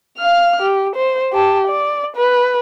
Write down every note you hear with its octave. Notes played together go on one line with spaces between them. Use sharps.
F5 F6
G4
C5
G4 A5
D5
B4